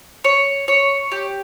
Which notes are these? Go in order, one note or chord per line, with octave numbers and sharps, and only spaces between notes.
C#5
C#5
G4